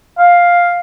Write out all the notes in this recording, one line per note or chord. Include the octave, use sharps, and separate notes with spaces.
F5